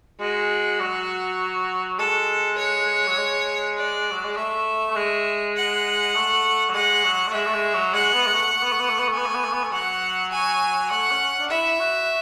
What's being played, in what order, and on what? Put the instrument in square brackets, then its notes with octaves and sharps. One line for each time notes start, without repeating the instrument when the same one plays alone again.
[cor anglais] G#3 [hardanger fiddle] F#4
[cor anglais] F#3
[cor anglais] G#3 [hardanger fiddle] A4
[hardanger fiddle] C#5
[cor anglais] F#3
G#3
[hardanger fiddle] D5
[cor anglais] F#3
G#3
[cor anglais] A3 [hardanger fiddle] E5
[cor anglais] A3
G#3
[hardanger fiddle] F#5
[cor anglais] A3
F#3
[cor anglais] G#3 [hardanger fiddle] F#5
[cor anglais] F#3
A3
[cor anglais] G#3 [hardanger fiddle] E5
[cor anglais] A3
G#3
F#3
[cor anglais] G#3 [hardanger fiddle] F#5
[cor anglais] B3
G#3
A3
A3
B3
A3
B3
A3
B3
A3
[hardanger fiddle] G#5
[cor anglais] B3
A3
B3
A3
B3
A3
[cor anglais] F#3 [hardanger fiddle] F#5
[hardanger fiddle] G#5
[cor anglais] A3 [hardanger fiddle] F#5
[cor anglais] C#4
D4
[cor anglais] E4 [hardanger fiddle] E5
[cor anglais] F#4